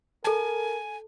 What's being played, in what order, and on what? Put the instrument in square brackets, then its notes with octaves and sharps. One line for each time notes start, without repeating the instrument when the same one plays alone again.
[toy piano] A4 A5 [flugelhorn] A#4 [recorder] G#5